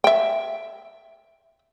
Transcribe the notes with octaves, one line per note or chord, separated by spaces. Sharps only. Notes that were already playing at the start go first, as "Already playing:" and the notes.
E5 G5